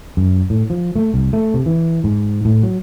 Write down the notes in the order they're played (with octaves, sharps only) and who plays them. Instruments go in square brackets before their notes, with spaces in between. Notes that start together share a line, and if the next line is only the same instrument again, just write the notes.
[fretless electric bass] F#2
A2
F3
A3
C2
A3
C3
E3
G#2
A2
F#3